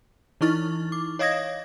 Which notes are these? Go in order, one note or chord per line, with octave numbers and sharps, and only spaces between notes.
E3 D#4 E4 C#6 F6 A6
D6
C#5 D#5 F5 D#6 G#6 A#6